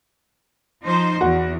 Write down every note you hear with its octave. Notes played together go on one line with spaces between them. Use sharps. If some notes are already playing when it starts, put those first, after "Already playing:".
F3 D#4 C5
E2 F#4